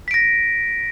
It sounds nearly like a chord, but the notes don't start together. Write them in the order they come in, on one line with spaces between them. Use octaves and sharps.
B6 D7 A#6